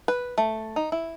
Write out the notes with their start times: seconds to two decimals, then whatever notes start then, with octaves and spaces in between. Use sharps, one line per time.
0.08 B4
0.38 A3
0.76 D#4
0.92 E4